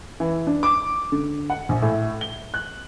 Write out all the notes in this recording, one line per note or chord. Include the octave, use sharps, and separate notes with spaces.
E3
D4
D6
D3
F#5
A#1
A2
G7
F#6